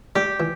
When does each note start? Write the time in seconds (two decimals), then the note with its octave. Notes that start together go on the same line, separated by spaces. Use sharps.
0.15 G3 G4
0.40 E3